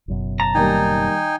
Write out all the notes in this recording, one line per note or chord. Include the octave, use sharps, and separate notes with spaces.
F#1 F#2 B2
A5 A#5
D#3 G3 A#3 D#4 G5 G#5